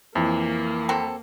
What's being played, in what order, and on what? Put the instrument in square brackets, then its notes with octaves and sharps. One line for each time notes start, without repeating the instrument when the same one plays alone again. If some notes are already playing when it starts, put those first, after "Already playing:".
[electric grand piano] F2 [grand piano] E3 [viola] A#3
[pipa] F#3 C4 A4